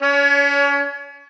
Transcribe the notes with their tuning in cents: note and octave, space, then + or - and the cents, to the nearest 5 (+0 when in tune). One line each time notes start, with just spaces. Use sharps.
C#4 +40 C#5 +25